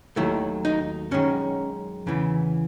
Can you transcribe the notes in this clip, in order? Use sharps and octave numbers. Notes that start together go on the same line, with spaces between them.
D#2 D#3 F#3 A3 E4
D#4
F#2 D#3 G#3 C#4
E2 C#3 E3